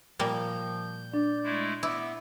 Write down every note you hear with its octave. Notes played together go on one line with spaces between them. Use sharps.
A#2 F3 G3 A#3 G6
D4 D5
G#3 A3 E4
B3 E4 D6